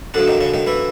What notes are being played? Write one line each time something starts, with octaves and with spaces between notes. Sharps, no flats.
F#2 D3 F3 D4
D#3 D#4
C#3 C#4
D#3 D#4
E3 E4